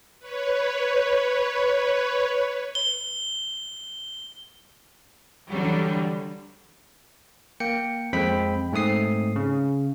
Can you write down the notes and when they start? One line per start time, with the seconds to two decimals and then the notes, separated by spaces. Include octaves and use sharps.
0.19 B4 C#5
2.75 G7
5.49 D3 E3 F#3 G3
7.60 A#3 G5 C#7
8.13 F2 G#3 C4 G5 B5 B6
8.72 G#2 A3 C4 D#6 C7
9.36 C#3